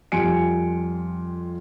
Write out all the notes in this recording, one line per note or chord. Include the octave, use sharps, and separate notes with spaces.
F2 G3 F4 G#5 C#7 D7